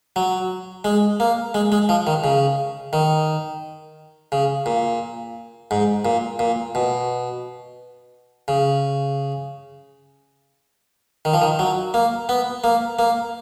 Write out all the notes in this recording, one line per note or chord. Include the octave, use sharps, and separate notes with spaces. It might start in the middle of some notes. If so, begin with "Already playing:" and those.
F#3
G#3
A#3
G#3
G#3
F3
D#3
C#3
D#3
C#3
A#2
G#2
A#2
A#2
B2
C#3
D#3
F3
D#3
F#3
A#3
B3
A#3
A#3